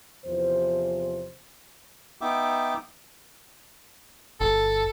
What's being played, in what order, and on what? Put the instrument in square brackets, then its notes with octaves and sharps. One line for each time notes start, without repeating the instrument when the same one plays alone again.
[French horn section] E2 C3 E3 F3 C5
[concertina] B3 D#4 E5 G5 D6
[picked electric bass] G1 [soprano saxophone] A4